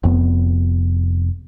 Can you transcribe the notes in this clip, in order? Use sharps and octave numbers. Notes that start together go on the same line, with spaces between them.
F1 F2 B3